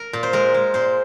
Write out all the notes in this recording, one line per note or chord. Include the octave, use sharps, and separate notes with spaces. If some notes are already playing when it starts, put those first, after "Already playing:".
Already playing: A#4
A#2
C5
G#3 A#4
G#3
A#2 C5